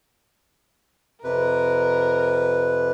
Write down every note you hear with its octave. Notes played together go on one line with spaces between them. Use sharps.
F2 C3 A#4 B4